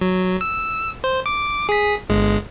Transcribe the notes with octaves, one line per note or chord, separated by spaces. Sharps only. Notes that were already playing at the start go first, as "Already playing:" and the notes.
F#3
E6
C5
D6
G#4 B6
G1 G#3